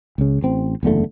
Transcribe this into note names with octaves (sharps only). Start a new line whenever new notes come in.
C#2 C#3
A1 C4
F#1 E2 D3 A3